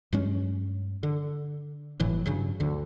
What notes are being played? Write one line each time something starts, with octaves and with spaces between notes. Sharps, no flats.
G2 F#3 G#3 C#4
D3
G1 A2 E3 F#3
G2 C#3 F#3
D2 D3